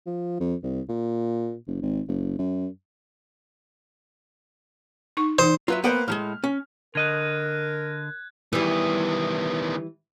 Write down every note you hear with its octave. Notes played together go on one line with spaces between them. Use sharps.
F3
F2
C2
A#2
F#1
G#1
F#1
F#2
D#4 C#6
E3 D#4 C5
F#3 F4 B4 E5
A#3 B3 B4 C5 F#5 G5
A2 F3 G#3 F6
C#4
D3 A#4 D#5 F#6 G#6
D#3 E3 G3 B3